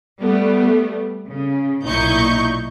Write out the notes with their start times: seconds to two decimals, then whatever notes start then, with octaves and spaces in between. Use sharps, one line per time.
0.20 G3 A3 B3
1.28 C#3
1.85 B1 A#2 D#4 E4 C#6 G6